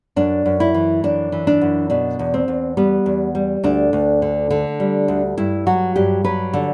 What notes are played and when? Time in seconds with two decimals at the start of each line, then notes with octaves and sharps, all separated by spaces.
0.16 F#2 D4
0.46 F#2
0.60 E4
0.74 E3
1.04 F#2 D4
1.32 E3
1.47 D4
1.61 F#2
1.90 B2 D4
2.19 E2
2.34 C4
2.48 E2
2.77 G3 B3
3.06 E2
3.35 G3
3.63 D2 D4
3.93 D2
4.22 D3
4.50 D3
4.80 G3
5.08 D2
5.38 G2 E4
5.67 F#3 F#4
5.96 G2 G4
6.24 F#3 B4
6.53 D3